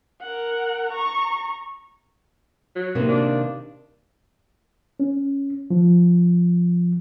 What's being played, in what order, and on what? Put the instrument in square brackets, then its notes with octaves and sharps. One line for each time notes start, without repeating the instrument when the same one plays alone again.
[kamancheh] A#4 F#5
A#5 C#6
[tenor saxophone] F#3
[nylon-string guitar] C3 D#3 A#3
[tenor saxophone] D4
[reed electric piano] C#4
F3